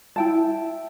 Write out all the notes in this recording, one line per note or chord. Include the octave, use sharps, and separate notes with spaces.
E4 G5 A5